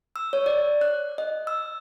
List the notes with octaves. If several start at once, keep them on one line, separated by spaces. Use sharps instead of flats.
E6
C#5
D5
F#6
D#5
E6